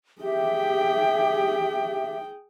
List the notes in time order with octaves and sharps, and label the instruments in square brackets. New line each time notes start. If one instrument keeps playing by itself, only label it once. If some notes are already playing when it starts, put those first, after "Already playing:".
[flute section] G4 E5 [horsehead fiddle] G#4 G5